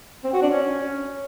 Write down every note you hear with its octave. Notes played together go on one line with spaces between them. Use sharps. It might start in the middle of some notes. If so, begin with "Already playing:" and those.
C4
F#4
D4
C#4